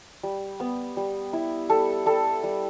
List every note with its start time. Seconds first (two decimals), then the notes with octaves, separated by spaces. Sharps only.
0.23 G3
0.60 B3
0.97 G3
1.33 E4
1.70 G3 A4
2.06 G3 A4
2.44 G3